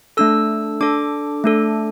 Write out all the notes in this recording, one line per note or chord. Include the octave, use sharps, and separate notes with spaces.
A3 D4 A4 E6
D4 A4 D6
A3 D4 A4